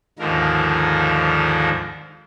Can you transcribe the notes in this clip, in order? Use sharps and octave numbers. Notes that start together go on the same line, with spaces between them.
D#2 G#2 D3 D#3 F3 A#4